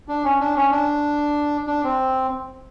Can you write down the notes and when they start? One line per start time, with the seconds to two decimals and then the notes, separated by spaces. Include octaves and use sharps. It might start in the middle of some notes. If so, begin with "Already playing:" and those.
0.08 D4
0.24 C#4
0.40 D4
0.56 C#4
0.71 D4
1.67 D4
1.84 C4